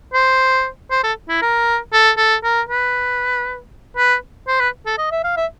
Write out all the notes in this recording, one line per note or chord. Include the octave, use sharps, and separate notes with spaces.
C5
C5
A4
E4
A#4
A4
A4
A#4
B4
B4
C5
B4
A4
D#5
E5
F5
E5